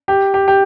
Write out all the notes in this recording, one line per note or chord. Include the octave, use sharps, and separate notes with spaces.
G4
G4
G4